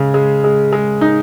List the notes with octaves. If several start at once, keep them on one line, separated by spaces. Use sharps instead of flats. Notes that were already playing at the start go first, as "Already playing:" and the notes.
Already playing: C#3 G#3
G#3
G#3
G#3
D#4